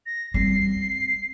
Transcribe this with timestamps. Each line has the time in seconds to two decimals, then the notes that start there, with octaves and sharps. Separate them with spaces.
0.06 A#6
0.34 G3 C4 C7